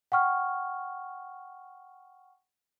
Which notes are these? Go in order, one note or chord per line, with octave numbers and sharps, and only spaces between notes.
F#5 G5 C#6 F6